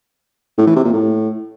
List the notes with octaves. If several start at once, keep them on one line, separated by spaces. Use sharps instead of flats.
A2
E3
C3
A#2
A2